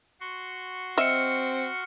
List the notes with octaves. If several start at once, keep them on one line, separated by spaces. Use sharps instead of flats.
F#4 C6 C#6
C4 D#5 E5 F6 C#7